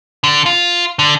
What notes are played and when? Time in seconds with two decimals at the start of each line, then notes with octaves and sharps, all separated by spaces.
0.24 D3
0.46 F4
0.99 D3